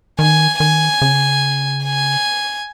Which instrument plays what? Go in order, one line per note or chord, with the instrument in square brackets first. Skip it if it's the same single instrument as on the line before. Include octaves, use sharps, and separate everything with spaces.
[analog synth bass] D#3 [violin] G#5
[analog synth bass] D#3 [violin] G#5
[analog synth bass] C#3
[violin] G#5